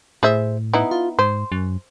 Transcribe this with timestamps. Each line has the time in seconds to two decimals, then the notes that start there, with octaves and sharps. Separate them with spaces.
0.23 A2 G#4 C5 E5
0.73 B3 D#4 E4
0.91 F4
1.19 G#2 C5
1.52 F#2